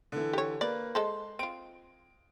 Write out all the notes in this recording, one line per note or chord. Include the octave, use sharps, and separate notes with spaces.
D3 E3
G4 C#5
A#3 B4 D5
G#3 A4 C5 C6
C4 F4 D7